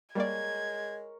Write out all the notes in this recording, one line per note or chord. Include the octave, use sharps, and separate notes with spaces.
G3 G#3 A#3 A#4 C#5 D5 G#6